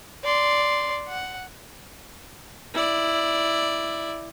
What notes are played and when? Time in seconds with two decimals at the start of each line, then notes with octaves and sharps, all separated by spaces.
0.25 D5 C6
1.08 F#5
2.74 E4 D5